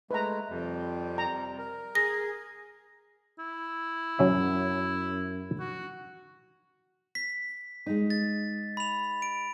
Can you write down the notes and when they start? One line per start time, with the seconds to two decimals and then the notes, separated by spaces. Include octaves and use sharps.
0.11 G#3 A3 B4 A#5
0.49 F2 C3 G3
1.18 A#5
1.59 A#4
1.95 G#4 A#6
3.39 E4
4.19 F#2 F#3 C#4 E5
5.60 F#4
7.15 B6
7.86 G#3 D#4
8.10 A6
8.77 B5 F7
9.22 D7